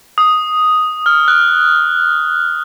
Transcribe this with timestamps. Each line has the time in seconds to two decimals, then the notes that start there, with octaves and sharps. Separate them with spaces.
0.18 D#6
1.06 F6
1.28 F#6